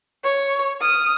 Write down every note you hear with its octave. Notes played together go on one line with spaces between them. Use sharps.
C#5
D#6 F6